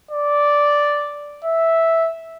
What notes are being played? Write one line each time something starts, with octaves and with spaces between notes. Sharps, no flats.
D5
E5